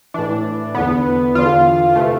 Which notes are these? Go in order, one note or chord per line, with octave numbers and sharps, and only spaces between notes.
A2 E3 D4
E2 D3 B3
E2 D3 F4
C3 E3 A3